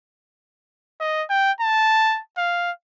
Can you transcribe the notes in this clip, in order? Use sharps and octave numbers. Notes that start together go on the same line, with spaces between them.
D#5
G5
A5
F5